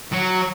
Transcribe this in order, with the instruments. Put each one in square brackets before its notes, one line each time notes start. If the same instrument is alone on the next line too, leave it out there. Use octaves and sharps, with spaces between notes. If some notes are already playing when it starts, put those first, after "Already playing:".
[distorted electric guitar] F#3